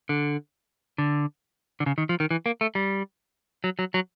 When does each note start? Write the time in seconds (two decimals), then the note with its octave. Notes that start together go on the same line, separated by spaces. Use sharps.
0.09 D3
0.98 D3
1.80 D3
1.86 C#3
1.98 D#3
2.09 F3
2.20 D#3
2.31 E3
2.46 A#3
2.61 A3
2.75 G3
3.64 F#3
3.79 F#3
3.94 F#3